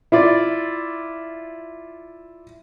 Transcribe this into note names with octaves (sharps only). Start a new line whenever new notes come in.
E4 F4 D5